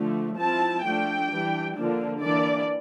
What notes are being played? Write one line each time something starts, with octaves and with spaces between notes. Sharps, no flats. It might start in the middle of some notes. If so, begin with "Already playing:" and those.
Already playing: D3 F3 A3
F3 C4 E4 A5
F3 A3 D4 G5
E3 G3 D4
D3 F3 A#3 D4
E3 A#3 D4 D5